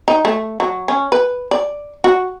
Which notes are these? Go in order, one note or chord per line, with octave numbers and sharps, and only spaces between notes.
D#4
A3
F#3
C#4
B4
D5
F#4